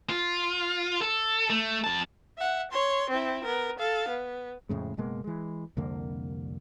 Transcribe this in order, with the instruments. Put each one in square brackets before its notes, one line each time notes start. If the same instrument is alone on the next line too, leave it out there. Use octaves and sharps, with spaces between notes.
[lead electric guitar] F4
A4
A3
F2 A5
[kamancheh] E5 F#5
C#5 C6
C4 E4
B3 A#4
A4 F5
B3
[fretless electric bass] F2 A2 C#3 G#3
F#1 B2 G#3 A#3
E3 G#3
C2 F2 D3 A#3